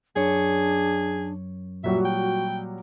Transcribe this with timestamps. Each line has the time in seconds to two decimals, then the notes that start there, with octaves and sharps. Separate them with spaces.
0.16 F#2 D4 G#4 C#5
1.84 A#2 F#3 G3 F#4 E5
2.05 G5